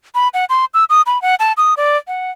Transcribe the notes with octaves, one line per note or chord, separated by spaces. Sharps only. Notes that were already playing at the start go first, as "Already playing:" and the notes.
B5
F#5
C6
E6
D#6
B5
F#5
A5
D#6
D5
F#5